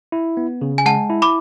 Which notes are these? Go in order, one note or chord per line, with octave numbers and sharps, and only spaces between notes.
E4
B3
C#3
G#5
G#3 F#5 A5
E4
B5 D6